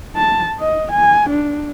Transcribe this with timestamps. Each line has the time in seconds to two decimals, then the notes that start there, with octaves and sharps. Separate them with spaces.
0.16 A5
0.60 D#5
0.91 G#5
1.29 D4